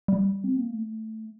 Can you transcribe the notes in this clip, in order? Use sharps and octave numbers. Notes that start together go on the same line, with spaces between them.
G3
C4
A#3
A3